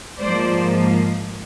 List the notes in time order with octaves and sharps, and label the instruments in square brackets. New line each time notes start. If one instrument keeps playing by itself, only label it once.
[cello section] G#2 F3 A#3 C5 D5